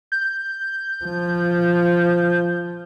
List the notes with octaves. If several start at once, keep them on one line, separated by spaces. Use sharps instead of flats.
G6
F3